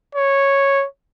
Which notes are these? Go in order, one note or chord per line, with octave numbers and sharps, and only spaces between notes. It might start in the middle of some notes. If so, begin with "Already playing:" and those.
C#5